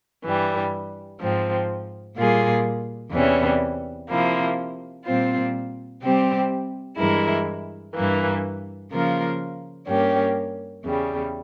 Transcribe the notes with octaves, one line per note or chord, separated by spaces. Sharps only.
G2 E3 G3
G#2 F3 C4
A#2 G3 A#3 F4 G#4
E2 C3 E3 G3 C#4
C3 F3 A#3 E4
A#2 G3 C4 F4 C5
C3 G3 C4 G4 C5
G2 E3 G#3 E4 A#4
G2 E3 A#3
C#3 F3 A#3 F4 A#4
G2 G3 A#3 C#4 G4
E2 C#3 G3